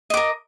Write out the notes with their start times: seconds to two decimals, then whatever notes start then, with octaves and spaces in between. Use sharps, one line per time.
0.10 D#5
0.14 D6
0.17 A#4